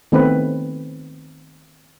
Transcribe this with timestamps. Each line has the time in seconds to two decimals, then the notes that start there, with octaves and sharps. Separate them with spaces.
0.12 D#3 A3 B3 C4 B4